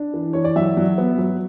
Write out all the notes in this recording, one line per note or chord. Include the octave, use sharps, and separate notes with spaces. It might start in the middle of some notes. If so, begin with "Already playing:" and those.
Already playing: D4
E3
E3 C#5
D5
F#3 E5
F#3
B3
F#3